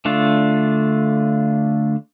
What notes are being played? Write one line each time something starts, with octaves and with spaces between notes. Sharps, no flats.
D3 A3 D4 F4